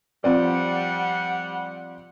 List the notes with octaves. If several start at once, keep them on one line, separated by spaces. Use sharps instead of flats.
F3 G3 C4 D5 F#5